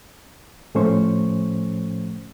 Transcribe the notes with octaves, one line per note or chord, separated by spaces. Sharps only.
A2 F3 A3 C#4 C5 C#6